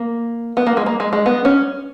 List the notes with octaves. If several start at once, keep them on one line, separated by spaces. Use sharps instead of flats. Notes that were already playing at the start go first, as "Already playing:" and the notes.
Already playing: A#3
B3
A#3
G#3
A#3
G#3
G#3
B3
C#4